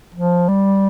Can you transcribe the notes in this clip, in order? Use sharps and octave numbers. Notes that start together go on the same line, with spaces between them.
F3
G3